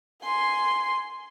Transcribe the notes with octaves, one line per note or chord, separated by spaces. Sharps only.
G#5 C6